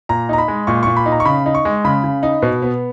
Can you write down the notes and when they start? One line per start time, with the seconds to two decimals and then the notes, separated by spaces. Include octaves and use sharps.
0.09 A#2 A#5
0.29 D#4 A#5
0.38 B5
0.48 G#3
0.67 A#2 C#6
0.83 A#2 C#6
0.97 B5
1.06 D#4
1.12 A#5
1.20 C#6
1.25 C#3 B5
1.46 D#4
1.55 C#6
1.65 G#3
1.85 C#3 B5
2.04 C#3
2.23 D#4
2.42 B2
2.62 B3